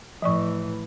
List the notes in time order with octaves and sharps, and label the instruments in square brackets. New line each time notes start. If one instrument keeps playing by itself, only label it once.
[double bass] A2 E3 [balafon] F3 D5 C#6